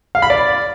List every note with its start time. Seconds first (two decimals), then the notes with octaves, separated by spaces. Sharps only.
0.15 F5
0.22 B5
0.30 D5